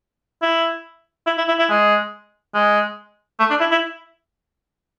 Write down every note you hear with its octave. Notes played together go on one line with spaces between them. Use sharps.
E4
E4
E4
E4
E4
G#3
G#3
A3
D4
E4
E4